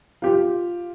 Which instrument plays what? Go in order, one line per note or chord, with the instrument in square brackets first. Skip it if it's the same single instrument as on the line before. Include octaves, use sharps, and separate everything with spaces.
[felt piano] F4 G4